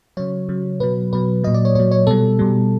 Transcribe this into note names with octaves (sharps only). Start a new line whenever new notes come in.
C#3 F#3 C#5
C#3 F#3
B2 F#3 B4
B2 F#3 B4
A#2 F#3 D#5
D5
C#5
A#2 F#3 C#5
C#5
B2 G3 A4
B2 G3